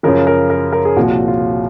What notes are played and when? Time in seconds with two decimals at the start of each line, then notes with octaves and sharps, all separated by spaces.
0.03 F#2 C#3 F3 A#4
0.27 A#4
0.50 A#4
0.73 A#4
0.85 G#4
0.97 C2 A#2 F3 F#4
1.28 F4